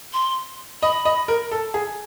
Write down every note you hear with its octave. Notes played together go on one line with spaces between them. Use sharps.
C6
D#5 B5
D#5
A#4
A4
G#4